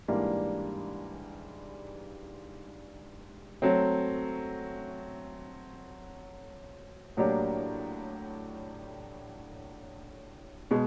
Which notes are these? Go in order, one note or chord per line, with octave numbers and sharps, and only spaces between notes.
G#2 E3 G3 A#3 D4
F#3 A3 C4
A2 F#3 A#3 D4 G4
B2 G#3